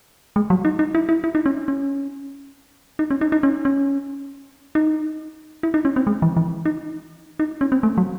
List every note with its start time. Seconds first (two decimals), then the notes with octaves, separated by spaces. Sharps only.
0.36 G#3
0.50 F#3
0.65 D#4
0.79 D#4
0.95 E4
1.09 E4
1.24 E4
1.35 D#4
1.46 C#4
1.68 C#4
2.99 D#4
3.11 C#4
3.21 D#4
3.32 D#4
3.43 C#4
3.65 C#4
4.75 D#4
5.63 E4
5.74 D#4
5.85 C#4
5.96 C4
6.07 G#3
6.22 E3
6.37 E3
6.65 D#4
7.40 D#4
7.61 C#4
7.72 C4
7.83 A3
7.98 F#3